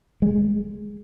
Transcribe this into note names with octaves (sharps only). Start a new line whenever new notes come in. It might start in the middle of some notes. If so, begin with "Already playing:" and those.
G#3